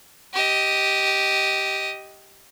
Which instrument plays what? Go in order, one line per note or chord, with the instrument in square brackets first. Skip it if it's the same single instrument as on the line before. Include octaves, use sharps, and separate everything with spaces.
[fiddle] G4 D#5